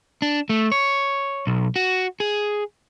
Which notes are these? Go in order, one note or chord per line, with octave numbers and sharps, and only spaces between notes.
D4
A3
C#5
B1
F#4
G#4